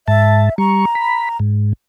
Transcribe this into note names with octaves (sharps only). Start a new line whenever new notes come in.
G#2 E5 A5
G3 A#5 C#6
B5
G#2